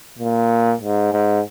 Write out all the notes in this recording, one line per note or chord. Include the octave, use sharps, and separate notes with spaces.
A#2
G#2
G#2